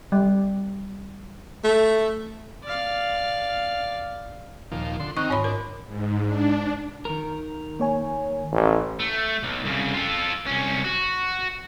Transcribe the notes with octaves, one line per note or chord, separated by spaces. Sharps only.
G3
A3
D5 F5
D#2 A#2 F3
D3 C6
D#3 C4 D#4 C#6 F#6
G#2 C#5 B5
D4 A#4
G#2
D4
D#3 A#4
A#3 C#5 G#5
A1
A3
B1
C2 C#3
F4 A4
C2 C#4
F#4